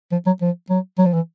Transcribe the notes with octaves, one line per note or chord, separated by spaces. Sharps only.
F3
F#3
F3
F#3
F#3
F3
E3